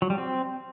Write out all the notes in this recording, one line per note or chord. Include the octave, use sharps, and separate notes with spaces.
F#3
G3
C4